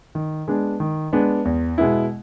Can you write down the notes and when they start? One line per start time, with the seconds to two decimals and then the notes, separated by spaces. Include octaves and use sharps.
0.15 D#3
0.48 G#3 B3 D4
0.80 D#3
1.13 G#3 B3 D4
1.45 E2
1.78 B2 G#3 B3 E4